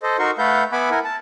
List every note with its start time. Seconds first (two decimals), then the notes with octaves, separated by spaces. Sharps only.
0.03 A4 C5 D#5
0.19 D#4 F#4 A#4 C6 C#6
0.38 A3 A4 B4 F5 F#5 G6
0.72 B3 E5 F#5 G#5 B5 D6
0.91 E4 A#4 F#5 G#5
1.04 A5